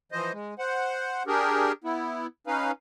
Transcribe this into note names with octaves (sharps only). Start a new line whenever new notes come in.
E3 F3 C5 D#5
G#3
C5 F#5
D4 G4 G#4 A#4
B3 E4
C#4 D#4 B4 F5